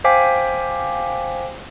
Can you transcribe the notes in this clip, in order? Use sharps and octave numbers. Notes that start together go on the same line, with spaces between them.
C5 F5 G5 G#5 D6 B6